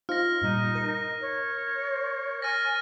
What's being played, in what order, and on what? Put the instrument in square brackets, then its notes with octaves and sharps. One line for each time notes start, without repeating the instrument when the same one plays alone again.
[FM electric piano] D#4 F4 C5 [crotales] F6 A#6
[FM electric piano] G2 A#2 G3 [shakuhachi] D#4
[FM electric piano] A#4
[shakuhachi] C#5
[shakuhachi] G#5 [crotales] F6 A6 A#6